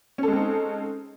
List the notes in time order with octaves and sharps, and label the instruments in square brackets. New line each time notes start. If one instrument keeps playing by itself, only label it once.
[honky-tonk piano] C#4
A4
G#3
C4
D#4